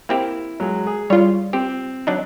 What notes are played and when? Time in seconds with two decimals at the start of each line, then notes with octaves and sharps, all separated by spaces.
0.09 A#3 C4 E4 G4
0.60 F#3 G#3
0.86 G#4
1.10 G3 F4 C#5
1.53 C4 G4
2.07 F#3 D4 D#4